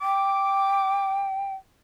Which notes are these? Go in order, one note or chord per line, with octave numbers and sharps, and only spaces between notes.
G5 D6